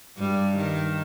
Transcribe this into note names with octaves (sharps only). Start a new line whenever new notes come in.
G2 G3
D#3